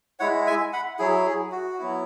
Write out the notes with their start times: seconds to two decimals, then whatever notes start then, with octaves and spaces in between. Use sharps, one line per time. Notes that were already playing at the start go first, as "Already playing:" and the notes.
0.20 G#3 E4 C#5 F#5
0.47 E5 G#5
0.73 F#5 B5
0.99 F#3 E4 G#4
1.26 G#4
1.52 F#4
1.79 F#3 B3 E4